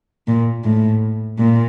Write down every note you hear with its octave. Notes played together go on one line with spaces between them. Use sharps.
A#2
A2
A#2